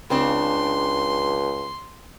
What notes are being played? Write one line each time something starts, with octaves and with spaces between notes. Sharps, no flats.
C#2 C#3 C4 D4 C6